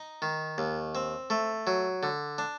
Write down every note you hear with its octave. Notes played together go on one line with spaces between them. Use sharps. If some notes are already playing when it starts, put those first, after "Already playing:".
Already playing: D#4
D#3
D#2
C4
A3
F#3
D3
D4